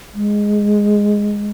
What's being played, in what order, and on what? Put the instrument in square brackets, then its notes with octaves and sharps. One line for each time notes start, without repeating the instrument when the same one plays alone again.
[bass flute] G#3